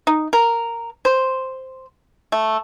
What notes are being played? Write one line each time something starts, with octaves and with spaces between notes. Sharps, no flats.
D#4
A#4
C5
A3